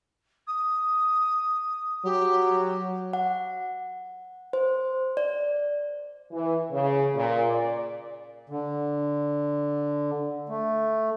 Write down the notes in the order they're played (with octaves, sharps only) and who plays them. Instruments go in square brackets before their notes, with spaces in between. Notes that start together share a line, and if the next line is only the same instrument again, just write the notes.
[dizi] D#6
[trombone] F#3 [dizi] G4
[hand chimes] F#5
C5
D5
[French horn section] E3
C#3
A#2
D5
[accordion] D3
A3